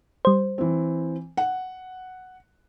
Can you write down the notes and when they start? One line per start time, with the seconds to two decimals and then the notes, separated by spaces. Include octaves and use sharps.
0.25 G3 C5
0.58 E3 C4
1.37 F#5